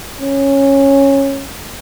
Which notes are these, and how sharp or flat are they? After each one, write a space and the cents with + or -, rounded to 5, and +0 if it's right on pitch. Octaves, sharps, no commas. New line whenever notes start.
C#4 -10